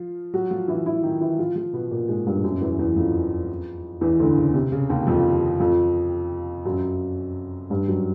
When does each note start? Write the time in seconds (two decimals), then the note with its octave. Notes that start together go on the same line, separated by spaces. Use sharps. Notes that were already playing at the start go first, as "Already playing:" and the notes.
Already playing: F3 F4
0.34 F#3 F#4
0.51 F3 F4
0.68 E3 E4
0.86 E3 E4
1.03 D#3 D#4
1.21 E3 E4
1.39 F3 F4
1.56 F3 F4
1.73 B2 B3
1.91 A#2 A#3
2.08 G#2 G#3
2.26 G2 G3
2.44 F#2 F#3
2.61 E2 E3
2.79 E2 E3
2.96 F2 F3
4.01 E2 E3
4.19 D2 D3
4.37 C#3
4.54 C3
4.72 C#3
4.90 D#2 D#3
5.07 F2 F3
5.60 F2 F3
6.65 F#2 F#3
7.70 G2 G3
7.88 F#2 F#3